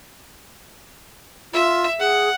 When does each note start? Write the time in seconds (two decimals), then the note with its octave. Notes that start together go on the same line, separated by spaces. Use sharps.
1.53 F4 E5
2.00 G#4 F#5